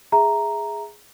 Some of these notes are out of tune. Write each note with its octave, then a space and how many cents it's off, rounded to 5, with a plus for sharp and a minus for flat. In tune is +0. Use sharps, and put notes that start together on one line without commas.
G#4 +0 E5 +0 A#5 +0